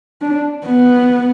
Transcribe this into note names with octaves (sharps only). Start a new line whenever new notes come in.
D4
B3